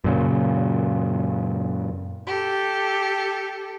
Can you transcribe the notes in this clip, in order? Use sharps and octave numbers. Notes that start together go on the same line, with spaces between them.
F#2 A#2 C#3
G4 A4